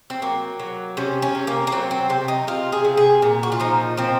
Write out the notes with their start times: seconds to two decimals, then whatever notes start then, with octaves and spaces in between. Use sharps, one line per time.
0.10 C4
0.22 F#3 A#3
0.60 F#3
0.97 C3 C#4
1.22 C#4
1.35 C3
1.47 A#3
1.67 A#3
1.72 F#3 C4
1.91 C4
2.09 C3 C4
2.28 D#4
2.47 C3 F4
2.72 G#4
2.85 C3
2.97 G#4
3.22 A#2
3.43 F#4
3.52 F4
3.60 F3 D#4
3.97 F3 C4